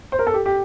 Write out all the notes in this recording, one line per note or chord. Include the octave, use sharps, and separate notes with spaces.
C5
A#4
A4
G4
G4